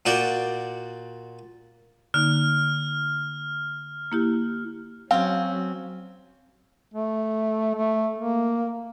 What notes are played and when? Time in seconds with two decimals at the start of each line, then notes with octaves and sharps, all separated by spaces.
0.06 A#2 F#4 D5 G5
2.14 D3 A#3 D#4 F6
4.12 A#3 E4 G4
5.11 F#3 C4 C#4 F5
6.94 A3
7.75 A3
8.18 A#3